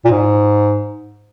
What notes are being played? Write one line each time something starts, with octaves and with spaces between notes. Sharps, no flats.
A#2
G#2